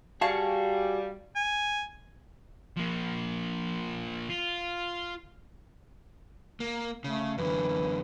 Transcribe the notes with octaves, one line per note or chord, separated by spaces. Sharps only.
G3 F#4 G#4 F5 A5 C#6
G#5
F3 A#3
F4
A#3
C#3 A3
F#2 D3 E3